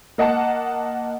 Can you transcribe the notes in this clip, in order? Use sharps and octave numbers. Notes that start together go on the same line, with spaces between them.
A#3 D#5 F#5 A5